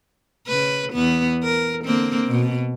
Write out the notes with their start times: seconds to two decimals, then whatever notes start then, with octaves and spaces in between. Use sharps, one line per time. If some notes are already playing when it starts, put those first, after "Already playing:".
0.47 C#3 B4
0.93 E2 B3
1.44 A#4
1.85 D3 A#3 C4
2.26 B2